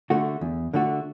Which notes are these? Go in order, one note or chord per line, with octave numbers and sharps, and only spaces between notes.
D3 A3 F#4
E2
D3 A3 F#4